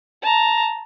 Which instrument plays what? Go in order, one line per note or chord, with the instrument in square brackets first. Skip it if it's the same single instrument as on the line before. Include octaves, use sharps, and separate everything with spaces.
[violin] A5 A#5